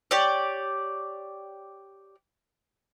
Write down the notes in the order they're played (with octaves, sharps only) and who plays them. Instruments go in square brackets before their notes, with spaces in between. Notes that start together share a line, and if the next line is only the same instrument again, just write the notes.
[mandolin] G4 C#5 D5